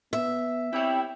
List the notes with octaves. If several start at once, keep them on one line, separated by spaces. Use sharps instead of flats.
B3 E5
G3 C4 E4 C#5 G5